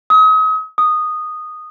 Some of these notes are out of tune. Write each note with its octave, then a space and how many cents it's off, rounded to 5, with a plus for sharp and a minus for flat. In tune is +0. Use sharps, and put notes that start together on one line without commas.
D#6 +35
D#6 -10